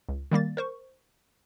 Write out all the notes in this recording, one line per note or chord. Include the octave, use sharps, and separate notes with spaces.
C#2
D#3 G3 A#3 A6
A#4 C5 C#6